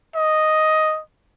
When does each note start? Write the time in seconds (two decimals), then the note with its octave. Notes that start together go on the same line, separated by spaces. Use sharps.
0.15 D#5